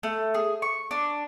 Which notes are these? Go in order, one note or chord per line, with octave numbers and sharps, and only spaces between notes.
A3
G#4
C#6
D4